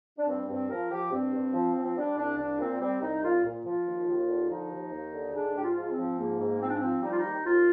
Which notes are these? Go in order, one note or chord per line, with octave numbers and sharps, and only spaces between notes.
D4
G2 C4
G2 C4
F3 A#4
F3 G4
G2 C4
G2
F3
F3
C4
G3 D4
C2 D4
C2 D4
A#2 C4
G3 C4
C2 D#4
C2 F4
A#2
F3 F4
D#2
D#2
D3
F3 D#4
D#2
D#2
D3
G#2 D4
G#2 G4
F4
F3
C4
F3
G#2 A#3
G#2
F3 C4
D4
F3 C4
G3 D#4
F4
D#2 D#4
D#2 F4